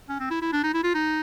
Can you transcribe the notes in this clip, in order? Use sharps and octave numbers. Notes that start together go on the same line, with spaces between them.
C#4
C4
E4
E4
D4
D#4
E4
F4
D#4